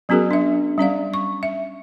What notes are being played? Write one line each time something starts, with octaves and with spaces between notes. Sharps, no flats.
F#3 B3 C#4 F#4 G#4 A#4
D4 E5
G3 C#4 D5 F5
C#6
E5